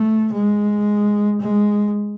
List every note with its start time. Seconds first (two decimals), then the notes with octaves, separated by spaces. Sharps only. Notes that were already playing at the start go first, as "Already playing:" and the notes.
Already playing: A3
0.32 G#3
1.41 G#3